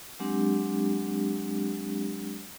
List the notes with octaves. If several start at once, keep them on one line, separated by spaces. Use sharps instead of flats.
F#3 G#3 C4 D4 G4